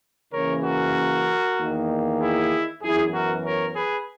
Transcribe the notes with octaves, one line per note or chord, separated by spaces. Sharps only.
C#3 E3 A#3 C#4 A#4 C#5
F#4 A#4
E2 D#3 A#3 D#4
E4 G#4
F#2 E3 B3 E4 G#4
F#4 A#4
A#4 C#5
G#4 B4